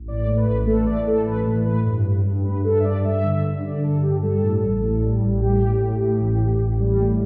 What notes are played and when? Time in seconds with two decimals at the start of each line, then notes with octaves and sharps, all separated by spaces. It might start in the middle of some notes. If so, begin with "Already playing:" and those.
Already playing: A1
0.08 A2 D5
0.27 A3
0.37 B4
0.47 A1
0.66 A3 A4
0.82 B4
0.86 A2 D5
1.06 A3 A4
1.26 A1 B4
1.46 A2
1.65 A2 B4
1.86 G2
2.06 G2
2.25 G2
2.44 G2 B4
2.65 G2 A4
2.80 E5
2.84 G2 D5
3.04 G2 E5
3.23 D3
3.44 G2
3.63 D3 D5
3.83 G2 A4
4.02 G2 G4
4.22 G3 A4
4.42 A2
4.62 A1
4.82 A2
5.02 G3
5.22 A1
5.41 A2 G4
5.60 A2
5.81 A2
6.01 A2
6.20 A1
6.40 A1
6.60 A1
6.80 G3
6.99 A2